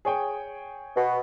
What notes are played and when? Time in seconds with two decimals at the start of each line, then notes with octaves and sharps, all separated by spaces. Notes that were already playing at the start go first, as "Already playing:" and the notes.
0.05 G#4 C#5 G5
0.96 B2